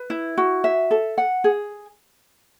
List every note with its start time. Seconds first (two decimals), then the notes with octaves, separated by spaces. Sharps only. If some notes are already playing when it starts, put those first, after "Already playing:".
Already playing: B4
0.10 E4
0.38 F#4
0.64 E5
0.91 A4
1.18 F#5
1.44 G#4